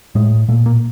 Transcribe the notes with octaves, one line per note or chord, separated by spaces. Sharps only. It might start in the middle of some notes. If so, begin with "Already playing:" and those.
A2 G#3
A#2 A3
A#3